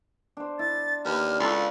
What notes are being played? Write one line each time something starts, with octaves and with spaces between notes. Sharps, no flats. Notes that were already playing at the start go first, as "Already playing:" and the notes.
D4 C5
E4 A6
D#2 B4 D5 F6
C#2 E4 F4 A4